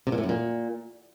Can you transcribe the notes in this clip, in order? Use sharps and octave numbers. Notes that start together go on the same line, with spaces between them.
C3
A#2
A2
F#2
A#2